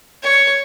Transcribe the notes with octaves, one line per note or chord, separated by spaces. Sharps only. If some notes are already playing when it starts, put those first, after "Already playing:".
C#5